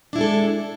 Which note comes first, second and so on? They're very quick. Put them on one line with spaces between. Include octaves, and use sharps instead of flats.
D4 E4 G#3 A4